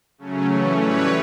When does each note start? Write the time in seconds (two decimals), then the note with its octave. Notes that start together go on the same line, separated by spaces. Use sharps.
0.18 C#3 F#3 A3 C#4
0.48 E3 A3 C#4
0.77 A2 E3 G3 B4 C#5